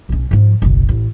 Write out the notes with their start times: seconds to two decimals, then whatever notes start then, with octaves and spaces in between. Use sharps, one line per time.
0.09 B1 C#4
0.31 G#2 F3
0.62 F#1 B1
0.89 A1